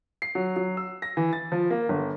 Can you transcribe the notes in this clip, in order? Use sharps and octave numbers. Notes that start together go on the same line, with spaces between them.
C7
F#3
F#3
E6
A#6
E3
A6
F3
A#3
G1